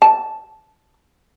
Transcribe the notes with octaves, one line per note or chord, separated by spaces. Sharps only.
A5